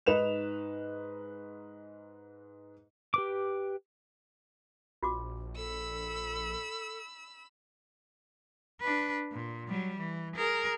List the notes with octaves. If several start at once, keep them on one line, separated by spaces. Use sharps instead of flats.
G#2 D#4 B4 E7 F7
G4 B4 D6
A#1 F4 F#4 D6
A4 B5 E6
D4 B4
A#2
F#3 G3
E3
G#4 A#4